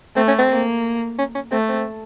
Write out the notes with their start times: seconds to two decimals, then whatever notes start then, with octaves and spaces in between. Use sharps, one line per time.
0.16 A3 C4
0.28 C#4
0.39 C4
0.50 A#3
1.18 C#4
1.35 C#4
1.51 A3 C4
1.69 C4